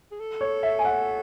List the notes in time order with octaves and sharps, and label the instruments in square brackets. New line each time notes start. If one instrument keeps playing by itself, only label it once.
[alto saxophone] G#4
A4
[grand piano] C#5
E5
G#5
F#5